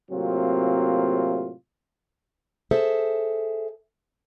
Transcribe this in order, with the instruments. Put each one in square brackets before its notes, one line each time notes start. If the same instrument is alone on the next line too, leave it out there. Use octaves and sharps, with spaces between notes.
[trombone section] A2 C3 F#3 A#3 C4 F4
[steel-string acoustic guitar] G#4 A4 C5 E5